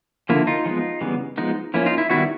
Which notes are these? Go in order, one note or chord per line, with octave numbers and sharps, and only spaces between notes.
D3 F3 A#3 E4
D#4 F4
F3 G#3 B3
C#3 E3 G3 B3
F3 G#3 B3 D#4
F3 A#3 C#4 E4
D#4 F4
E4
D#3 G3 B3 E4 F#4